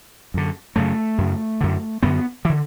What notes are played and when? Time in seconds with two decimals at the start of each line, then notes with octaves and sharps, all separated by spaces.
0.34 F#2 D3
0.76 F#2 C#3 A3
1.18 F#2 C#3
1.61 F#2 D3
2.03 F#2 D3 B3
2.45 E3
2.49 D3